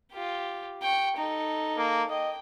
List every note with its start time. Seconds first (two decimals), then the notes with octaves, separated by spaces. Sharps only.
0.12 F4 G4
0.82 G5 C#6
1.17 D#4 A4
1.78 A#3
2.09 D#5 G5